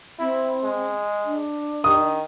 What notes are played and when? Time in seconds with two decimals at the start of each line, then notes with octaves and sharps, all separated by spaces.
0.19 C4 E4
0.64 G#3
1.25 D4
1.84 D#3 D#6